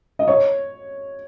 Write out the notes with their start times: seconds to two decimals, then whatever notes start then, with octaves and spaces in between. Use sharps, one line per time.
0.19 D#5
0.28 C#5